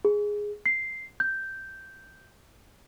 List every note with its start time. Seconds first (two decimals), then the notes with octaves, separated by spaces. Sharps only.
0.05 G#4
0.66 C7
1.20 G6